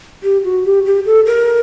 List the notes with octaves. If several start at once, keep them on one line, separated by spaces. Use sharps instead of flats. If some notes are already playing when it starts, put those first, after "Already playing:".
G4
F#4
G4
G4
A4
A#4